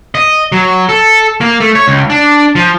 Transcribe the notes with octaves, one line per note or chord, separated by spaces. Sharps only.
D#5
F#3
A4
A#3
A3
C#5
C#2
D4
F3